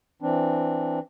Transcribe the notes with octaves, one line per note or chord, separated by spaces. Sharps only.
E3 C4 D4